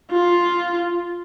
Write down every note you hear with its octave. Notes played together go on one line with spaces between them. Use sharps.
F4